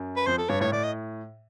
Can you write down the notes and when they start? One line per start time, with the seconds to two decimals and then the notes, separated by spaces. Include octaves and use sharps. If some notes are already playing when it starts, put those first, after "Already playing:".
Already playing: F#2
0.16 B4
0.27 F2 C5
0.38 A4
0.49 G2 C#5
0.61 A2 C#5
0.72 A2 D5
0.83 D#5